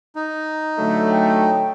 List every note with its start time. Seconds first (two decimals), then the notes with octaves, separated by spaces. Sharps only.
0.16 D#4
0.79 D3 F#3 A3
1.11 G5